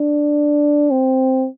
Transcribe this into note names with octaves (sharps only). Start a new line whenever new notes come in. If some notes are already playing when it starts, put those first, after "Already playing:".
Already playing: D4
C4